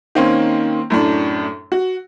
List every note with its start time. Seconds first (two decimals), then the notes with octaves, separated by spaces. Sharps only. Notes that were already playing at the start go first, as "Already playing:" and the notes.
0.15 D#3 A#3 C4 C#4
0.90 F#2 A2 D4
1.72 F#4